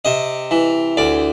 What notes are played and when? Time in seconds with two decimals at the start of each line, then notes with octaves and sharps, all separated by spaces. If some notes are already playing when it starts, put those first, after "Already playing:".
0.05 C3 D#5
0.51 E3
0.97 D2 D5